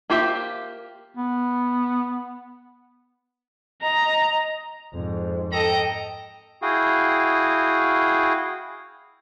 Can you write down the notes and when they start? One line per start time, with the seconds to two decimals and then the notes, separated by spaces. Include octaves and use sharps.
0.10 A#3 F4 G4 C5 E5
1.16 B3
3.82 D#5 A#5
4.93 F2 G#2
5.52 A4 D#5 G5 A#5
6.62 E4 F#4 G#4 F5 G5 D#6